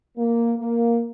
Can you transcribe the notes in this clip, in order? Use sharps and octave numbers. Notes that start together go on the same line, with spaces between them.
A#3
A#3